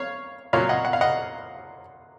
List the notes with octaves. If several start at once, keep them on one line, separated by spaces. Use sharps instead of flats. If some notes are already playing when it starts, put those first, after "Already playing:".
Already playing: C#5 F5
A#2 F#3 C#5 F5
D#5 F#5
F#5
F5
D#5 F#5